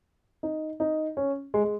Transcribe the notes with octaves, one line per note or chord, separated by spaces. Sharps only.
D#4
D#4
C#4
G#3
G#3